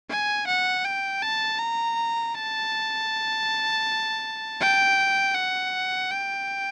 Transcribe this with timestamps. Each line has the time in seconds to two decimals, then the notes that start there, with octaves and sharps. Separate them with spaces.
0.10 G#5
0.48 F#5
0.85 G5
1.22 A5
1.59 A#5
2.35 A5
4.60 G5
5.35 F#5
6.11 G5